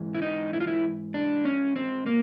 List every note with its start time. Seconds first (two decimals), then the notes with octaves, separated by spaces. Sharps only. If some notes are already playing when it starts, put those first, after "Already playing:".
Already playing: G#2 E3
0.14 E4
0.22 D#4
0.53 E4
0.60 F4
0.67 E4
1.14 D4
1.45 C#4
1.76 C4
2.06 A#3